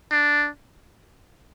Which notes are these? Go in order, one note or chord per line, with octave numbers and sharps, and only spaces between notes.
D4